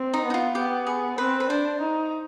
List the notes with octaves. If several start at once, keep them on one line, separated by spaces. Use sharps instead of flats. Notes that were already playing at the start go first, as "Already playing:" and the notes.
Already playing: C4
D#4
B3
D#4
F4
B3 G4
G#4
C4 B4
B4
D4 C5
D#4